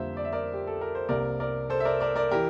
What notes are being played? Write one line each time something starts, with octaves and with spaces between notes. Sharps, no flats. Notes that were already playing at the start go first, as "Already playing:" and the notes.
Already playing: F2 D3 G3 A#3 C5 E5
D5
E5
A#4 D5
G4
A4
A#4
C5
C2 C3 G3 A#3 A#4 D5
A#4 D5
A4 C5
E5
A#4 D5
A#4 D5
A#4 D5
E3 G4 A#4